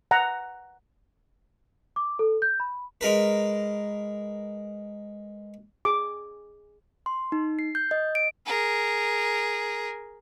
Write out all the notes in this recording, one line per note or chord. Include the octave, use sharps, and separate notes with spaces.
F#5 A#5
D6
A4
G6
B5
G#3 A#4 B4
G#4 D6
C6
D#4
C7
G6
D#5
D7
G#4 A#4